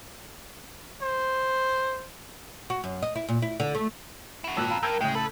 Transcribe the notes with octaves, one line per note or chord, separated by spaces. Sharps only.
C5
F#4
F#2
D#5
E4
A#2
E4
D3
A3
E4 F#4
G#1 F2 A#2 E6 F#6
F5 A#5 B5
G2 A#4 E6 G6 G#6
A2 C#3 G#3 G5
A4 B4